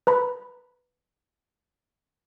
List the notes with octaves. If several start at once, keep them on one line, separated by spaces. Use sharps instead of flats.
B4 A#5 B5